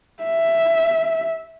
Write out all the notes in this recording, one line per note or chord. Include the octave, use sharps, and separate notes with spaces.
E5